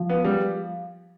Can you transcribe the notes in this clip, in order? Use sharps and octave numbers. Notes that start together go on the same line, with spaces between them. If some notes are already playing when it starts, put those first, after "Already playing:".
Already playing: F3
B3
G3